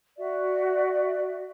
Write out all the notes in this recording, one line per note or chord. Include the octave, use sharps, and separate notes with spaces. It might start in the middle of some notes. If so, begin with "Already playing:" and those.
F#4 D5 E5